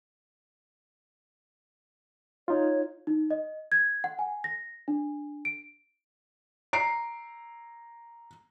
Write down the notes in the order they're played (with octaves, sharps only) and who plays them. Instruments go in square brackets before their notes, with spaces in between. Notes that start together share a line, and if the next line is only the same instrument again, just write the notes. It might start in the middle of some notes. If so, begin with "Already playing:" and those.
[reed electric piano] D#4 F4 [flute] C#5
[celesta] D#4
D#5
G#6
F#5
G#5
A#6
D4
D7
[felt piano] A#5 C7 D7